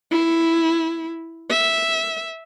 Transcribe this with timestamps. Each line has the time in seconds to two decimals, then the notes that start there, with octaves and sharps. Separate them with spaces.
0.11 E4
1.50 E5